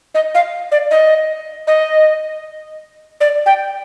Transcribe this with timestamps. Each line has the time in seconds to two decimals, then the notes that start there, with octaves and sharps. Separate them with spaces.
0.15 D#5
0.35 F5
0.72 D5
0.91 D#5
1.67 D#5
3.21 D5
3.46 G5